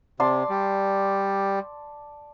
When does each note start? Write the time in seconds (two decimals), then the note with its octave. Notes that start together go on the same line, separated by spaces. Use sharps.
0.20 C3 D5 A5 C6
0.50 G3